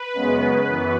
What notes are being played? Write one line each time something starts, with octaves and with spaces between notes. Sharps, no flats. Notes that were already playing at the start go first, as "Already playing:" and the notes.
Already playing: B4
F#2 C#3 G#3 B3
F#2 E3 B3